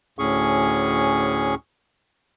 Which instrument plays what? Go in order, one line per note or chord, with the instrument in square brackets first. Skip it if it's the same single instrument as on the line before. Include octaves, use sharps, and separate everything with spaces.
[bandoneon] D2 A2 C#4 G#4 C#6